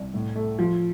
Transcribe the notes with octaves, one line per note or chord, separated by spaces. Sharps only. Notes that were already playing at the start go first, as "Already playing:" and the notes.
Already playing: C2
A2
A3
F3